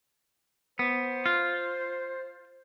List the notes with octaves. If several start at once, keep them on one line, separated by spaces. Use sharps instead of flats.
B3 C5
F4